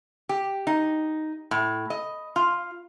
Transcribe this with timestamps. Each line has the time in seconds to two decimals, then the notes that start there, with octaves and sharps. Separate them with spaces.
0.29 G4
0.67 D#4
1.51 A2
1.90 D#5
2.36 F4